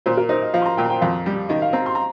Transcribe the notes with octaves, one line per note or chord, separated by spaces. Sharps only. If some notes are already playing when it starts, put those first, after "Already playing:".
A#2 C5
A#4
D#4 C5
D#5
F3 F5
C6
A#5
A#2 G5
A#5
G5
F2 F5
G3
D#3 D#5
F5
C4 A#5
C6
A#5